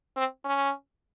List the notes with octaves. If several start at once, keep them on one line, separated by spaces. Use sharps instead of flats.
C4
C#4